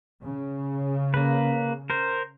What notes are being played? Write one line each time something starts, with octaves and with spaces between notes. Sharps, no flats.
C#3
A#3 B4
A#4 C5